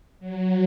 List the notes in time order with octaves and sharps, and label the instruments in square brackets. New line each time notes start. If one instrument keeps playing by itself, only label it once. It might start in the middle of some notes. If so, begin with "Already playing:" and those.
[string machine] F#3